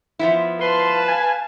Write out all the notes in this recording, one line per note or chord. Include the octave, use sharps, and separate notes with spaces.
F3 B3 E4
B4 F5 A5 C6
G#5